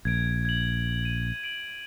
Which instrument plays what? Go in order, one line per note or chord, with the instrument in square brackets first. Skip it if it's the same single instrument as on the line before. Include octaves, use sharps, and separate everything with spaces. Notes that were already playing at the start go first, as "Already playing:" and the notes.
[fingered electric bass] A#1 [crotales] G#6 D7
[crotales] G#6 F#7
D#7
D7 F#7